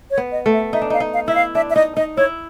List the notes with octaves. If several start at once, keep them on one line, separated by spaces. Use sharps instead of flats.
C#5
B3
D#5
A3
E5
D#4 E5
D4
D#4 F5
D#4
F5
E4 E5
F5
D4 E5
E5
D#4 D#5
D#4 D#5
E4 C#5